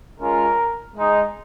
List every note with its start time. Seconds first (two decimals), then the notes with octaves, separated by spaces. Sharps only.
0.20 G#3 C#4 F4 A#4
0.95 G#3 D#4